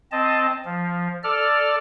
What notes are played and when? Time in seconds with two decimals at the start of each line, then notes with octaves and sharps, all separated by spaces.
0.12 C4 D#5 A5
0.65 F3
1.24 A4 D5 F6